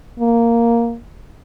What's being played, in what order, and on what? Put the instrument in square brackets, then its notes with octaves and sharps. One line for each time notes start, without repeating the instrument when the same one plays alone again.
[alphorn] A#3